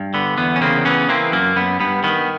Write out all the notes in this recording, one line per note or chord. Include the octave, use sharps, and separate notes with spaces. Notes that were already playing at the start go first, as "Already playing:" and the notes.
Already playing: G2
D3 B3
E2 B3
C#4
C#3 A#3 C4
E3 B3 C#4
E3 A#3 C4
F#2 A#3
F#2 B3
G2 B3
D#3 B3